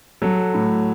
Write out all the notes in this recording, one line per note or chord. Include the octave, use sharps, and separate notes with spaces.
F#3 A4
A2